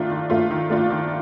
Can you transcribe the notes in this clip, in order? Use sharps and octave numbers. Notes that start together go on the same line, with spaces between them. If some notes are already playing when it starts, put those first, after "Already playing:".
Already playing: D#3 A3 D4 F4
D#3
A3 D4 F4
D#3
A3 D4 F4
D#3